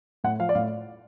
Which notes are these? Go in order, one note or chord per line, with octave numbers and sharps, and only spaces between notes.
A2 F#5
F3 F5
D5
A2 F5